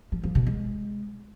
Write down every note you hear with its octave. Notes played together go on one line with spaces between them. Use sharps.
F3
F3
B2
G#3